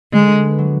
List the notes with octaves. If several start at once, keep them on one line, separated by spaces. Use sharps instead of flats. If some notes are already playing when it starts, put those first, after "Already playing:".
D3 G#3
D4
B3
F#3